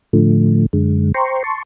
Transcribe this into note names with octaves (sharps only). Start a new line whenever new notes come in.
A2 D3 F3 A3
F#2 D3 G#3
C5 G5 A#5 C6 C#6
A5 C6 C#6